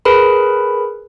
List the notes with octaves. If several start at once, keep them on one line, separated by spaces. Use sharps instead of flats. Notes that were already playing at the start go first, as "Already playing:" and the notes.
G#4 A#4 B4 B5